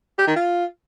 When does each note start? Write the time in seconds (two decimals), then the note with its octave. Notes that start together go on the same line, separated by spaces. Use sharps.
0.18 G4
0.27 D#3
0.36 F4